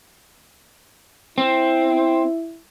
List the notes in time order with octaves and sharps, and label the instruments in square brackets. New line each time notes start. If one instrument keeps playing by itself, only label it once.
[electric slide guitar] C4 [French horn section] E4